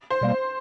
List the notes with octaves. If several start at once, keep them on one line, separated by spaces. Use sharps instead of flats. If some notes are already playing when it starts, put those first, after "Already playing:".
C5
B2 G3 A#3